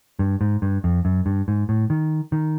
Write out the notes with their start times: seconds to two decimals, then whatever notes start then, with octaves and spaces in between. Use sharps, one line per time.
0.19 G2
0.41 G#2
0.62 G2
0.84 F2
1.05 F#2
1.26 G2
1.48 G#2
1.69 A2
1.90 D#3
2.32 D#3